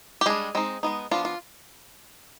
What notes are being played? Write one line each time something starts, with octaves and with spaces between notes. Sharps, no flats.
G4
G3 G#3 D4 G#4
G#3 C4 D#4
G#3 B3 D#4
F3 B3 D4 F4
F4